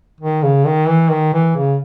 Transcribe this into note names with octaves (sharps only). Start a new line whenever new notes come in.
D#3
C#3
D#3
E3
D#3
E3
C#3